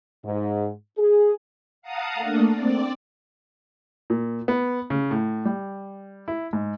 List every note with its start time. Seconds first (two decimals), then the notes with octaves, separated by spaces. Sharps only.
0.24 G#2
0.98 G#4
1.82 F5 F#5 A5 A#5 D#6
2.14 A3 A#3 D4
2.50 C4 D5
4.10 A#2
4.48 B3
4.90 C#3
5.11 A2
5.45 G3
6.28 E4
6.53 G#2